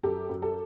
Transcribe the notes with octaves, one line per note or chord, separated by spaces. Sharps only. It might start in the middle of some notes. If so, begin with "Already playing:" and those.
F#2 G4 A4
F#2
G4 A4